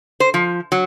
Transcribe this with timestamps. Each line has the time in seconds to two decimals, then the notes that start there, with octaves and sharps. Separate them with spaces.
0.20 C5
0.34 F3
0.72 F#3